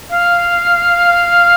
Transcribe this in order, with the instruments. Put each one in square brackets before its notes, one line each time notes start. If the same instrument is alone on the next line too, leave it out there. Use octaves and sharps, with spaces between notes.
[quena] F5